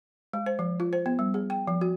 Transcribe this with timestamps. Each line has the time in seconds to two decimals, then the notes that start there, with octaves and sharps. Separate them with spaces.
0.33 G#3
0.46 C5
0.59 F3
0.80 F4
0.93 C5
1.06 B3
1.19 G3
1.34 G#4
1.50 G5
1.67 F3
1.81 F#4